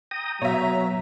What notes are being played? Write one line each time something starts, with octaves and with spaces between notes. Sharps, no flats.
G5 A#5 D#6
B2 F#3 C#5 E5 A#5